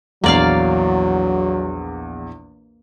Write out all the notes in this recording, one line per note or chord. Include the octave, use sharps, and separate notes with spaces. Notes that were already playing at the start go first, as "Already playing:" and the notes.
A#1 E2 F#3 A#3 D5 F5